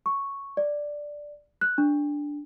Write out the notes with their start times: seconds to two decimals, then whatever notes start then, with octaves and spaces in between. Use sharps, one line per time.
0.06 C#6
0.57 D5
1.61 F#6
1.78 D4